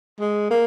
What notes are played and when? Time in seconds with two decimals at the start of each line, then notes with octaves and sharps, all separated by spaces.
0.20 G#3
0.50 A#3